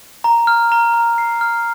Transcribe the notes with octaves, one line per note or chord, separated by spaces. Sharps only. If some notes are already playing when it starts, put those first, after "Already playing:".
A#5
F6
A#5
A#5
C7
F6